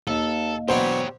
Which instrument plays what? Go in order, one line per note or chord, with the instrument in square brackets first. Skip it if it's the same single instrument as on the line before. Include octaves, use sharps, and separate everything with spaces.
[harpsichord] D#2 [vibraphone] A#3 D#5 F5 [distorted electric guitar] A4
[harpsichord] B2 F#3 D4 [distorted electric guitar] G4 C#5 [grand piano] C5